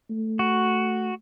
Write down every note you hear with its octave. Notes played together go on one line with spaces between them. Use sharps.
A3
F#4